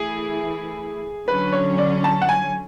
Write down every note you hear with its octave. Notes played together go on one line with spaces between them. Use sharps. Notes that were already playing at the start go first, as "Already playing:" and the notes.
Already playing: E3 A3 E4 G#4
D3 F#3 C#4 B4
C#5
D5
A5
F#5
G#5